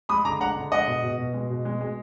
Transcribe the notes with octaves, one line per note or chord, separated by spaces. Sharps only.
G#3 B5 D#6
D3 A#5 D6
G#3 F#5 A#5
D3
G#3 D#5 F#5
B2
B2
B2
G#3
B2
G#3
G#3